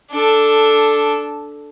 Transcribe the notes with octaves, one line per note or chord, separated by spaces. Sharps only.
D4 A4